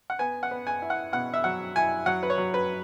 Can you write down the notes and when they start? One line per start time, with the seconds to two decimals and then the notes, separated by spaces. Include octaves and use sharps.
0.10 F#5
0.19 B3 G#5
0.43 F#5
0.51 B3
0.67 G#5
0.82 E4
0.90 F#5
1.12 B2 F#5
1.34 E5
1.44 F#3 F#5
1.76 E4 G#5
2.06 F#3 F#5
2.23 B4
2.30 C#5
2.38 F#3
2.54 B4